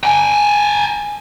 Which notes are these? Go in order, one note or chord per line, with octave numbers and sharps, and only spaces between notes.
G5 G#5